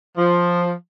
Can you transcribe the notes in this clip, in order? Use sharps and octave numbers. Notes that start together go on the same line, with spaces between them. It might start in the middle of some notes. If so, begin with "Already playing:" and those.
F3